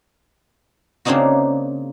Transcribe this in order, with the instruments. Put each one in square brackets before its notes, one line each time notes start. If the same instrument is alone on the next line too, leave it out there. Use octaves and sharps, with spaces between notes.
[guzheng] C#3 A#3 C4 D4 D#4 F#4